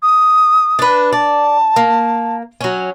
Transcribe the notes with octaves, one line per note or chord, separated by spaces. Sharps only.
D#6
D4 B4
D5 A5
A#3
F#3 C#4